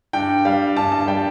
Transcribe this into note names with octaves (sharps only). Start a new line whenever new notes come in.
G2 G5
G3 F5
G2 A5
A5
G3 G5